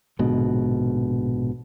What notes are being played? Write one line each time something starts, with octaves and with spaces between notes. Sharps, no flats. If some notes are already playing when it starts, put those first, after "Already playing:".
A#1 G#2 B2 D3